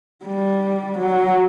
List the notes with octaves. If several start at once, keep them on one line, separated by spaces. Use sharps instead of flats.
G3
F#3